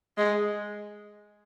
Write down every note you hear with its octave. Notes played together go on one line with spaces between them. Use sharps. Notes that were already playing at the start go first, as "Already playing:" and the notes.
G#3